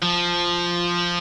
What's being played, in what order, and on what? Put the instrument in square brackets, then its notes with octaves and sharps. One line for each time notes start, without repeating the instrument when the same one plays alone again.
[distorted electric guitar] F3